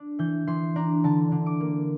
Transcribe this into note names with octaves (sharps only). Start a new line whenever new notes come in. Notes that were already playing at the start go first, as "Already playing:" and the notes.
Already playing: D4
E3 G6
E3 C6
D4 A#5
D3 A5
D3
D6
A#3